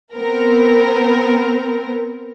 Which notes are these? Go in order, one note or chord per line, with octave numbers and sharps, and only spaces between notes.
B3 C4 A#4